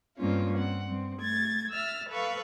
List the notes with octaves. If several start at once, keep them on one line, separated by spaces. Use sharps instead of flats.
G2 A#3 C4 C#4 F4
C4 F#5
G2 C4
A3 G#6 A6
E5 E6 F6 A6
A4 B4 F5 C#6